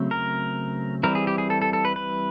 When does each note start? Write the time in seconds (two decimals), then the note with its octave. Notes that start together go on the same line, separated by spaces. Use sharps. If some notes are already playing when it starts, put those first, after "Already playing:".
Already playing: C#3 F#3 A3 C4
0.11 A#4
1.03 E3 G3 C4 A#4
1.15 G#4
1.27 G4
1.38 G#4
1.50 A4
1.62 A4
1.73 A4
1.85 B4
1.96 B4